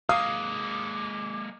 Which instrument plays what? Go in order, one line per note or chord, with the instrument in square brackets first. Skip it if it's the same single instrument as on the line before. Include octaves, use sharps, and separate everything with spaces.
[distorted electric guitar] G#3 A#3 [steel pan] F5 [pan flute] D6 [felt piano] D#6